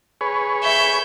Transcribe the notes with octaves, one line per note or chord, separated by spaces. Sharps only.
G#4 B4 C#5
E5 G6